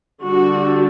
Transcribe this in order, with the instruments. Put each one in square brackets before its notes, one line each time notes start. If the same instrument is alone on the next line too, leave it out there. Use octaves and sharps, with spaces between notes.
[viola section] D3 G3 D4 F#4